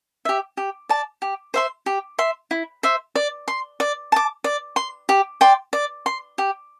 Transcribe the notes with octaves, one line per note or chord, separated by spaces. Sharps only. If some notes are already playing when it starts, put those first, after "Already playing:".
G4 E5
G4
D5 A5
G4
C5 E5 C6
G4
E5 C6
E4
C5 E5
D5
C6
D5
A5 D6
D5
C6
G4
D5 G5 C6
D5
C6
G4